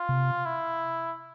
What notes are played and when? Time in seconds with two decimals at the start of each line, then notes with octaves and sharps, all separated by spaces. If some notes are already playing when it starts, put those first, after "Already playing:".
Already playing: F4
0.09 C3
0.46 E4